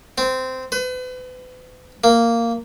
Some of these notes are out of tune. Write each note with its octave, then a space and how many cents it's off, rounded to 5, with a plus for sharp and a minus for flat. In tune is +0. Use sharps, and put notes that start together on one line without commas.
C4 -15
B4 +40
A#3 -10